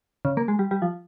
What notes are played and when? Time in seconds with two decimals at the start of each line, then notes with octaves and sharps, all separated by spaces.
0.25 C#3
0.37 A#3
0.48 G#3
0.59 G3
0.71 G3
0.82 F3